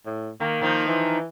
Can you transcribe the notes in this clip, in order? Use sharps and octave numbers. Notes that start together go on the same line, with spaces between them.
A2
D#3 A#3
D#3 F3 D#4
E3